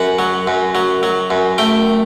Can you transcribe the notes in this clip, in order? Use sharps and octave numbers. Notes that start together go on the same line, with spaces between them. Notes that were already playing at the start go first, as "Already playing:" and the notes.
Already playing: F#2 F#5
F#3
F#2
F#3
F#3
F#2
A3 G5